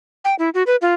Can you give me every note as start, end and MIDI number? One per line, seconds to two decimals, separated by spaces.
0.25 0.35 79
0.39 0.49 64
0.54 0.63 66
0.67 0.76 71
0.82 0.94 65